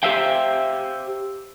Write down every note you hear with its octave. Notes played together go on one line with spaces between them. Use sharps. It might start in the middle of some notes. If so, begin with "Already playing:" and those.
G4 C5 E5 F5 G5